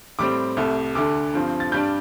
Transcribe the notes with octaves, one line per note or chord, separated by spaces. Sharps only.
A2 G3 C4 D6
C2 C3 A3
D2 D3 A3 D6
G2 F3 C4
A6
G2 G3 D4 G6